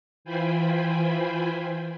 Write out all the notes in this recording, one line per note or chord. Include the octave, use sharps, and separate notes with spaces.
E3 F4 C5 G5 G#5 B5